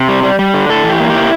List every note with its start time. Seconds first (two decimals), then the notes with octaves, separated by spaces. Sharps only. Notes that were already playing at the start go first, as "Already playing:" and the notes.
Already playing: C3
0.08 G3
0.23 G3
0.39 G3
0.54 D3
0.69 A2 A4
0.84 E3
0.89 G4
1.00 A#3
1.10 E4 G4